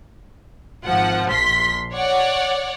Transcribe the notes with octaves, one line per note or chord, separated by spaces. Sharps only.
G#1 F3 F#5
A#1 C6 B6
C#5 D5 F#5